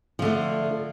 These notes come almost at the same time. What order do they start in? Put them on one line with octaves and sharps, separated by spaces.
F3 D3 A3